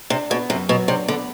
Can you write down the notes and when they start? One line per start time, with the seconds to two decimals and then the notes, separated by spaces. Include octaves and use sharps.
0.10 C3 D4
0.30 B2 B3
0.50 F#2 C3
0.69 B2 F#3
0.88 C3 D4
1.08 D3 B3